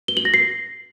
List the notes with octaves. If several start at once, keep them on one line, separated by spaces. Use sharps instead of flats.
G7
F#7
A#6
C7